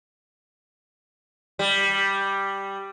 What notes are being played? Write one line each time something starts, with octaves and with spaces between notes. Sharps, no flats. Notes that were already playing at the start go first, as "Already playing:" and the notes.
G3